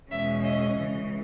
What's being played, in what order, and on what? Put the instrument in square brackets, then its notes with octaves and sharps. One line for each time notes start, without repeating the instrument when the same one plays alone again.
[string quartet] E2 B2 G#3 C#4 E5
D#5
C#3 E3 G#3